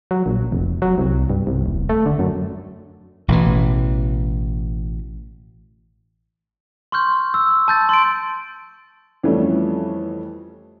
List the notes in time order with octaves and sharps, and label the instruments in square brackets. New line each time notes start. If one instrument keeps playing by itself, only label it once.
[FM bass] F#3
A#1
F1
F#3
C2
G2
C2
D#1
A3
D3
F#2
[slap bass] A1 B2 D#3 E3
[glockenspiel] C6 C#6 F6 G6
E6
A5 G6 A6
C6 A6 D7
[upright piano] F2 E3 F3 G3 A3 C#4